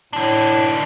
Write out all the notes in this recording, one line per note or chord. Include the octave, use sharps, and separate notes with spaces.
A2 E3 D4